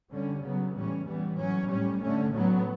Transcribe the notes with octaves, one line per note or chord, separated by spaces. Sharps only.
D3 G3 C#4
C#3 F#3 B3
A2 E3 G3 C#4
E3 G3 B3
A2 F#3 C#4
A2 G3 C#4
D3 A3 C#4
A2 F#3 B3